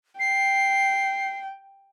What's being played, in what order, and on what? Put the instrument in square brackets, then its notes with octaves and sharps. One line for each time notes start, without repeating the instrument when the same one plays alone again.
[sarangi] G5 [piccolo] C7